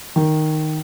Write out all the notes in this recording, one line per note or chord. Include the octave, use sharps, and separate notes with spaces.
D#3